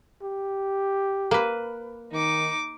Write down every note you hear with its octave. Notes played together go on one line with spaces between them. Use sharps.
G4
A#3 B4
D#3 D#4 D6